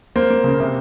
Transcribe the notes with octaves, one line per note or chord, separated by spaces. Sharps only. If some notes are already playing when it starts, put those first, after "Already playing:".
A#3 C5
A#3
C#3
C3